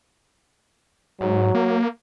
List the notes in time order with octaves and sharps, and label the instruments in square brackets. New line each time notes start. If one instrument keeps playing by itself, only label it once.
[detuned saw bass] G#2 [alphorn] F#3
[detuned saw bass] A#3